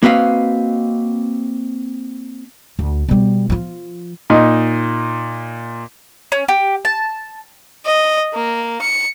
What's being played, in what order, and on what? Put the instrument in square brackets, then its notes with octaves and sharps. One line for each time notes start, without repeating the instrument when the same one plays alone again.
[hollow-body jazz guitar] A#3 C4 F#4 B4 D#5 F5
[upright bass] D2
B2 G3
F3 F4
[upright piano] A#2 D#4
[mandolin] C#4
G4
A5
[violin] D#5
A#3
C#7